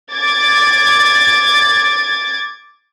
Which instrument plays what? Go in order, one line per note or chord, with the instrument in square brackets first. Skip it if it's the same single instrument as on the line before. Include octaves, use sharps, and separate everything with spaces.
[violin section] D6 G#6 A6